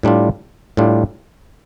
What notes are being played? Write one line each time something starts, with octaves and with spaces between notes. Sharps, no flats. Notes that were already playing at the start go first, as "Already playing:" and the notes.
A2 G3 D4 F4
A2 G3 D4 F4